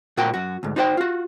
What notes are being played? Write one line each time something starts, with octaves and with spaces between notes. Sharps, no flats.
A#2 F#4 A#4 F#5 G5
F#2 F#4
D2 G#2
D#4 F#4 C5 F5 G5
F4 F#4